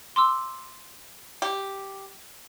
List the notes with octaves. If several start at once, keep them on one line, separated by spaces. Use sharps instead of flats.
C6 D6 E6
G4